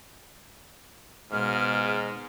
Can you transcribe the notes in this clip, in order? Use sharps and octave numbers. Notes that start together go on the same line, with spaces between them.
C#2 G#2 B2 G#3 B3 F6